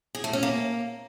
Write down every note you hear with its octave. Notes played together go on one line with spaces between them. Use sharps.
G#4
A3
C#4
A#3